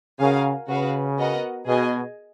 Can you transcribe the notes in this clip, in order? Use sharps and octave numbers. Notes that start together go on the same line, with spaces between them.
C#3 F#4 A#4 F5 G#5
C#3 F#4 B4 F5
B3 F#4 A#4 D#5 F#5
B2 G#4 D#5 G#5